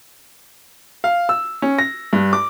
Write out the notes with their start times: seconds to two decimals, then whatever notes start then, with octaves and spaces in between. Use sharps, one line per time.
1.04 F5
1.29 E6
1.62 C#4
1.79 A#6
2.13 G2
2.33 D6